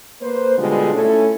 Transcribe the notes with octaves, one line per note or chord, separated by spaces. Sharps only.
A#3 B4 C5
B2 D3 G3 G#3 F4
A3 C#4 E4 A4